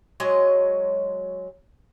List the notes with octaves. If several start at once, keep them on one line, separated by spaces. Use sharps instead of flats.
F#3 G#3 C#5 D#5